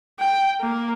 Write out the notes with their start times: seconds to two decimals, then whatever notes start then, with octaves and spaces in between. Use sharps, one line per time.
0.20 G5
0.61 A#3